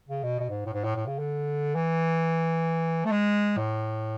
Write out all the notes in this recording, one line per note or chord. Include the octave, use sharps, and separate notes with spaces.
C#3
B2
B2
G#2
A2
G#2
A2
A2
C#3
D3
E3
A3
G#3
A2